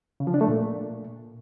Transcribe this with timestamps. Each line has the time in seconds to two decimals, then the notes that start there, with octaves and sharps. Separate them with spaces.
0.20 C#3
0.27 F3
0.34 D4
0.41 A3
0.48 A#2